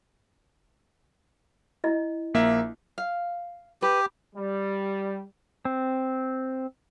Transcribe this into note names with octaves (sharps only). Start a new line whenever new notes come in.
E4 D#5
A#1 A#3 E5
F5
G4 B4
G3
C4